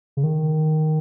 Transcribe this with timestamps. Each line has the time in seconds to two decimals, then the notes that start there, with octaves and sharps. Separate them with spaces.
0.17 C#3
0.24 D#3